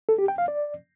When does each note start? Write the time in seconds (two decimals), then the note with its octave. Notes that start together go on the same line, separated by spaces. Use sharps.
0.09 A4
0.18 G4
0.28 G5
0.38 F5
0.48 D5